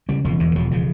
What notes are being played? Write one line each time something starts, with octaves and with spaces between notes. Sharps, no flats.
C#3 G3
E1 F3
E2 E3
E3
E1 F3
C#3 F3